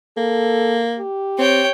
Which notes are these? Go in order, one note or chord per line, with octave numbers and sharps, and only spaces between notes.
A#3 A4
G4
C4 C#5 G5